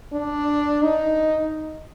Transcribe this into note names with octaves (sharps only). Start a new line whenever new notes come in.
D4
D#4